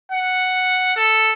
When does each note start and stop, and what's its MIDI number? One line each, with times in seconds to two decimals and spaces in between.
0.12 0.95 78
0.97 1.32 69